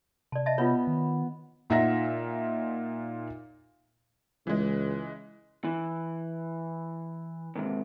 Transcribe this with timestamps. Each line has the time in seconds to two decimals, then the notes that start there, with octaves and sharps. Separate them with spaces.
0.32 C3 D5 A5
0.46 D#5 E5 A5
0.58 B3 F4 B4 C#5
0.87 D#3
1.70 A#2 D#4 F4 E5 F#5 A#6
4.47 C#2 E3 G#3
5.64 E3
7.56 D#2 G#2 C3